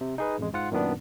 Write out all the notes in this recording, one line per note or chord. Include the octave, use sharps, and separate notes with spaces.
C3
D#4 G#4 B4
A1 F2 G#3
G#2 F4 F#5
F#2 A#2 D#3 B3 D4